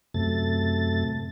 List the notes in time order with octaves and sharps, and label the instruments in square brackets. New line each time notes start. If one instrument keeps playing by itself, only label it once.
[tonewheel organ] F#2 C3 A3 A6